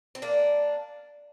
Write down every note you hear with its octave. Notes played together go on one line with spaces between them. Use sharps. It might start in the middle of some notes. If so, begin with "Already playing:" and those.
C4
A#3 D4